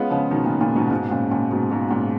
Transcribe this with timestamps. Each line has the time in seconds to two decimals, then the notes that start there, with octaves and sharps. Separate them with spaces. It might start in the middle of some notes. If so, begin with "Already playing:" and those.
Already playing: G#3 B3 C#4 F4
0.10 C#3 F3
0.31 B2 D#3
0.45 A#2 C#3
0.60 A#2 C#3
0.76 G#2 B2
0.91 G#2 B2
1.11 A#2 C#3
1.31 A#2 C#3
1.50 G#2 B2
1.70 G#2 B2
1.91 A#2 C#3